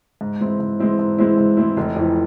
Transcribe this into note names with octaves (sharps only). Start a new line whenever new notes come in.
G#2
E3 G#3 C4 E4
G#2
E3 G#3 C4 E4
G#2
E3 G#3 C4 E4
G#2
E3 G#3 C4 E4
F1
F2 E3